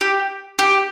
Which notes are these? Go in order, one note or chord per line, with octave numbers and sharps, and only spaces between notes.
G4
G4